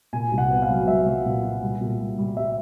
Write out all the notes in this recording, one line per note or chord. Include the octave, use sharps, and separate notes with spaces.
A#2 G#5
C2
F#5
B3
F5
F#3
F#3 E5
F#3
A#2
A#2
G3
A#2
G3
G3
G3 E5